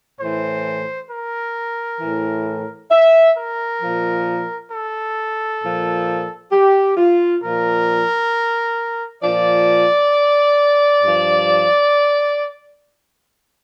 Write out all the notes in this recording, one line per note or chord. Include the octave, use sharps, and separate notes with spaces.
A2 E3 C5
A#4
A2 E3
E5
A#4
A#2 F3
A4
A#2 F3
G4
F4
A#2 F3 A#4
A#2 F3 D5
G2 F3